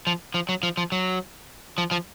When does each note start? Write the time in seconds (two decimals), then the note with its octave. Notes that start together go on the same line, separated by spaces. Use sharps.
0.07 F3
0.34 F3
0.49 F#3
0.63 F3
0.77 F3
0.92 F#3
1.78 F3
1.91 F3